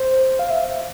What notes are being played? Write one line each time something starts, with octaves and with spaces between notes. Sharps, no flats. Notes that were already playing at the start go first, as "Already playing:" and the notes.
Already playing: C5
F5
E5